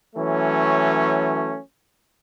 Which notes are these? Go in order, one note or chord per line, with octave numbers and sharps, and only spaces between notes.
E3 F#3 A3 C#4